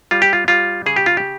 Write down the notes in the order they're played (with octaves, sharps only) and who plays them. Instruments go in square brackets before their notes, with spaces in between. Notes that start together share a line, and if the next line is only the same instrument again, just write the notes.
[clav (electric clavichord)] G3 F4
G4
F4
G3 F4
C#3 G#4
G4
F4
G4